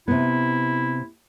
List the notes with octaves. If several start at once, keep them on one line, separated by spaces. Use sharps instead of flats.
C3 B3 E4